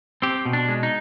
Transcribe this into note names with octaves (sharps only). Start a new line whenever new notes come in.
C4 G4
B2
D4
G#3
D#4